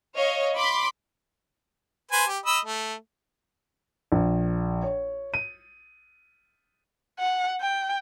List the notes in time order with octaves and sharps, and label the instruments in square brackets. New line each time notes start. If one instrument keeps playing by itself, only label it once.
[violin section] C#5 D#5 F5
B5 C6 D6 B6
[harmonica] B4 C5 G#5
G4
D#5 B5 E6
A3
[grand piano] A#1
C#5
D#7
[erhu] F#5
G5